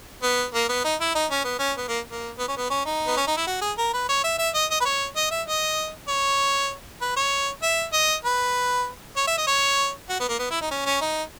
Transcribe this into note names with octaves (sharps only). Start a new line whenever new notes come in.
B3
A#3
B3
D#4
E4
D#4
C#4
B3
C#4
B3
A#3
A#3
B3
C#4
B3
C#4
D#4
B3
C#4
D#4
E4
F#4
G#4
A#4
B4
C#5
E5
E5
D#5
D#5
B4
C#5
D#5
E5
D#5
C#5
B4
C#5
E5
D#5
B4
C#5
E5
D#5
C#5
F#4
B3
A#3
B3
E4
D#4
C#4
C#4
D#4